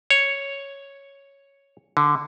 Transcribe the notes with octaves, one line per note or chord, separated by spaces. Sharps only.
C#5
D3